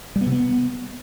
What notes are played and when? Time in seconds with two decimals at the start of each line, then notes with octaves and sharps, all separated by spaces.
0.16 G3
0.21 B3
0.26 C3
0.32 B3